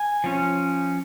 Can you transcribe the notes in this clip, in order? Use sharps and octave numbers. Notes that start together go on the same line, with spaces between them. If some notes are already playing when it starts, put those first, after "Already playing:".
Already playing: G#5
F3 C#4